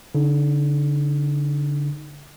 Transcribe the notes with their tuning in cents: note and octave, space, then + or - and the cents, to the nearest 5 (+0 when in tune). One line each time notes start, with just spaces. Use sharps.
D3 -30 D#4 +0